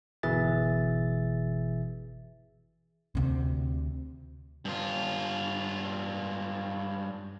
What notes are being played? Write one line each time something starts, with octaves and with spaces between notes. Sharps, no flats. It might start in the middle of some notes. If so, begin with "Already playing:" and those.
G1 B2 E3 G#4 E5 A6
D2 C3
G2 F4